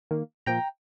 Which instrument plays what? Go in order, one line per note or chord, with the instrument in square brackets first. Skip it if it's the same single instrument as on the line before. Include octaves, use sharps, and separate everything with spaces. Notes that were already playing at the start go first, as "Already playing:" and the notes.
[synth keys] D#3 A#3
A#2 F3 A#3 G5 A#5